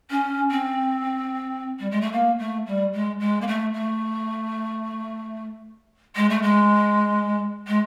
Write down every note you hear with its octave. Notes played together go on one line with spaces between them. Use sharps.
C#4
C4
G3
G#3
A3
A#3
A3
G3
G#3
G#3
A#3
A3
A3
G#3
A3
G#3
G#3